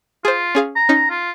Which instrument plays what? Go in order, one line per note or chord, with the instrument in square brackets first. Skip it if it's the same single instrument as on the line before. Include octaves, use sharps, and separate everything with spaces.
[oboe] F4 [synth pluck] G#4 C5
[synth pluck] C#4 G#4 F5
[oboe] A#5
[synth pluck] C#4 D#4
[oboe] F4